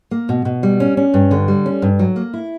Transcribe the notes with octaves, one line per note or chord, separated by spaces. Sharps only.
A#3
B2
B2
G3
C#4
C#4
G2
D3
G3
C#4
G2
F#3
A#3
E4